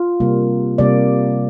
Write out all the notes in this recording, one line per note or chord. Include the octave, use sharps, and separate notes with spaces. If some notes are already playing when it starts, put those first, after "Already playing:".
Already playing: F4
C3 G3 A#3
C3 G3 A#3 D5